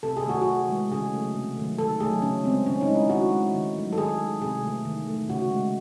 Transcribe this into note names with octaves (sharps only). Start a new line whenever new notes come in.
C3 A4
G#4
D#3 A3 F#4
G#4
C3
E3 G#3
C#3 G#4
F#3 A3
C3
D#3 F#3 A3
D#3 A4
F#3 A3 G#4
C#3 C#4
E3 G#3 C4
D#3 C#4
D#4
G#3
E4
D#3 F#4
G#3
D#3
F#3 A3
A4
D#3 G#4
G#3
C3 G#4
E3 A3
D#3
A3
C#3 F#4
G#3